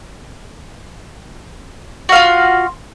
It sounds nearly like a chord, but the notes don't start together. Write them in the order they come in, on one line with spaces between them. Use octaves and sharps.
F#4 F5 F4